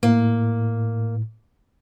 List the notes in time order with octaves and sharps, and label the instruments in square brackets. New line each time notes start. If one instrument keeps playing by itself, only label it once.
[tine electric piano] A2 [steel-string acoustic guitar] A#3